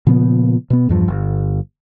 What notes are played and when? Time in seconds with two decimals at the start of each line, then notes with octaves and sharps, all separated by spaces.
0.07 A#2 C#3 F3 B3
0.70 B2 B3
0.89 E2 G2 F3
1.08 G1